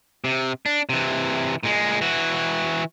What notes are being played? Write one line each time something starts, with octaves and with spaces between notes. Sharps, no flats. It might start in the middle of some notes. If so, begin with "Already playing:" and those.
C3
D4
C3 E3
A#2 G#3
E3 F#4